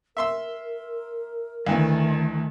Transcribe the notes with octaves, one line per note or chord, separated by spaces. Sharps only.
A#4 E5 C6 E6
D2 D#3 E3 A3